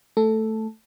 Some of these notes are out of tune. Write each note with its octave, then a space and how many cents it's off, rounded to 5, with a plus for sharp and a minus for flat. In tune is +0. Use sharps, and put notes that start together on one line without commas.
A3 +0 A4 +0